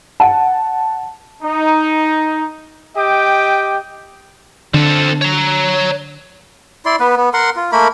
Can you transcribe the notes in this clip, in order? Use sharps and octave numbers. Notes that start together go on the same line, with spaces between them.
F#5 A5
D#4
G4 D#5 G5 D6
D3 C4 A4
C#5 A#5
E4 D5 C6
B3 B4
B3
A#4 F#5 C6
F4
A3 A#3 A#4 B5